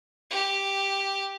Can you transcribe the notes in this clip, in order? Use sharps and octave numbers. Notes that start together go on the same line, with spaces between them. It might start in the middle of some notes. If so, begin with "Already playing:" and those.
G4